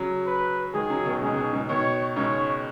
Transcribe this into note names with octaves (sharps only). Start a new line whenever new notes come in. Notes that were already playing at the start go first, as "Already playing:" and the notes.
Already playing: C#3 F#3
B4
D#3 G#3 G#4
C#3 F#3
B2 D#3
G#2 C#3 G#4
C#3
B2
G#2 C#3
B2 D#3 C#5
G#2 C#3 C#5